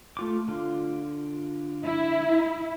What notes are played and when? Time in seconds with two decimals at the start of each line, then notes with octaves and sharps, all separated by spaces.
0.17 A3 F4 D6
0.48 D3 F4
1.84 E4